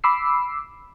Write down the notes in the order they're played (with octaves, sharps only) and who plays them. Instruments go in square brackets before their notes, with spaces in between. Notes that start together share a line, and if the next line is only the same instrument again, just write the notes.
[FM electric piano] B5 D6 E6 C7